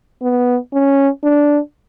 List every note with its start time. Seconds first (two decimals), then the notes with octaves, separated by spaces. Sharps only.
0.22 B3
0.73 C#4
1.23 D4